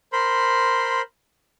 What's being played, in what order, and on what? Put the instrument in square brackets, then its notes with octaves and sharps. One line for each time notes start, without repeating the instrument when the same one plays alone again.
[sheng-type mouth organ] A#4 C5 B5 C6